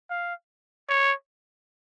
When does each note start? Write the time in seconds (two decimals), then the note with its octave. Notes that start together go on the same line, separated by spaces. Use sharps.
0.10 F5
0.89 C#5